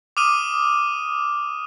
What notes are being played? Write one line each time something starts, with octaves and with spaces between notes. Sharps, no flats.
D6 D#6 F6 D#7